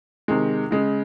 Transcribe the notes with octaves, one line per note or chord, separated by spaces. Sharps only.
C3 D#3 G#3
C#3 G#3